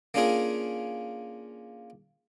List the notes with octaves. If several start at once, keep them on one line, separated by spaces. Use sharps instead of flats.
A#3 C#4 D4 F4 G#4 A#4